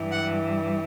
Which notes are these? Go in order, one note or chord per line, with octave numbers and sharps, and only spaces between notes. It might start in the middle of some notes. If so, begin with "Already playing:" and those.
Already playing: G2 E3 G3
F#5